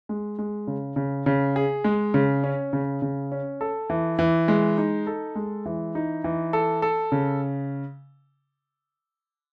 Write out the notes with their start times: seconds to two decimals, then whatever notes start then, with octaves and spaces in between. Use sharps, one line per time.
0.09 G#3
0.39 G#3
0.67 C#3
0.96 C#3
1.26 C#3
1.56 G#4
1.84 G#3
2.14 C#3
2.44 C#4
2.73 C#3
3.02 C#3
3.32 C#4
3.61 A4
3.90 E3
4.19 E3
4.48 G#3
4.78 D#4
5.07 A4
5.35 G#3
5.66 E3
5.95 D#4
6.24 E3
6.53 A4
6.82 A4
7.12 C#3